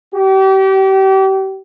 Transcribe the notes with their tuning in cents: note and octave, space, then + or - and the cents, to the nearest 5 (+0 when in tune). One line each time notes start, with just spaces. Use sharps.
G4 -35